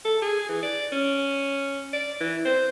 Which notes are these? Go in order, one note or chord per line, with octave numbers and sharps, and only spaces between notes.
A4
G#4
E3
D5
C#4
D5
E3
C5